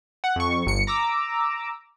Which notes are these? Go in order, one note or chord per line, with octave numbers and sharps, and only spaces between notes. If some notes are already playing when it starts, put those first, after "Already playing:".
F#5
F2 C#6
G1 C#7
A#5 D6 E6